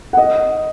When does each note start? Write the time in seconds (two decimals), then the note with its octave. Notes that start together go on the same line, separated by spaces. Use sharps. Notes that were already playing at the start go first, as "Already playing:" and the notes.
0.13 F#5
0.17 D#5